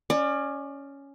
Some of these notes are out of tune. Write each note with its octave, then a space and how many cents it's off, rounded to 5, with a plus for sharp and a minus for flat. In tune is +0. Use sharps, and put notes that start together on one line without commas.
C#4 +5 D5 +30